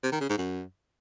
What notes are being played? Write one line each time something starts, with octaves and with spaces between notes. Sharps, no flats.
C3
D#3
C#3
G#2
F#2